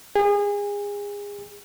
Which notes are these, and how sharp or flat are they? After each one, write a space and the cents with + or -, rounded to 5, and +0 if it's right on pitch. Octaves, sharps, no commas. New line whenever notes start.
G#4 -30